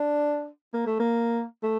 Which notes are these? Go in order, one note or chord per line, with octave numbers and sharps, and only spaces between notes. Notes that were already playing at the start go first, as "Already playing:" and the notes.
Already playing: D4
A#3
A3
A#3
A3